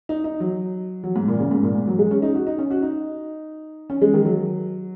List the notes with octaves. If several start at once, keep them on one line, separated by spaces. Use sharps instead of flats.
D#4
D#4
F#3
F#3
G#2
A#2
C#3
G#2
A#2
G#2
F#3
G#3
C#4
D#4
F#4
D#4
C#4
F#4
D#4
C#4
G#3
D#3
F#3